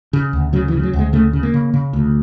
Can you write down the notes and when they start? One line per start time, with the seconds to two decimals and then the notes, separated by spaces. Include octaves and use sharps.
0.13 C#3
0.33 D2
0.53 C#3 F#3
0.68 E3
0.74 C#3
0.79 F3
0.83 F#3
0.93 D2
0.99 G#3
1.13 C#3 A3
1.33 C#3
1.43 A#3
1.54 C#3
1.74 C#3
1.93 D2